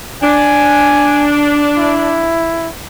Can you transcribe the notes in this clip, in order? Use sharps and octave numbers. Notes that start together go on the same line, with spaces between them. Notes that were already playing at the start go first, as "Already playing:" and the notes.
D4 G#5
E4